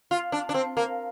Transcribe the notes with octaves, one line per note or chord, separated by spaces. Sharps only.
F4
D4
D4
C4
A#3